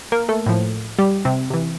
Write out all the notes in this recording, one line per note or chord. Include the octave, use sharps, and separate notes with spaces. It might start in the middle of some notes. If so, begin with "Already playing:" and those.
A#3 A#4
A3 A4
A2 F3
G3 G4
C3 C4
C3 E3